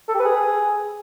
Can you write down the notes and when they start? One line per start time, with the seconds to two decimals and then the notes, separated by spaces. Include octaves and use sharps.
0.08 A4
0.14 G4
0.20 B4
0.25 G#4